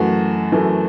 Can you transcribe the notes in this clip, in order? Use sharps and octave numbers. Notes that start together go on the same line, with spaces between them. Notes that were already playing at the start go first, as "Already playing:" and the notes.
Already playing: F#2 E3 A3 F#4
F#2 E3 A3